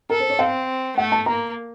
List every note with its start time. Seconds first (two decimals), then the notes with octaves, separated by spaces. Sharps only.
0.10 A4 A#4
0.20 C5
0.30 C#5
0.39 C4 F5
0.97 A3 F#5
1.12 A5
1.26 A#3 A#5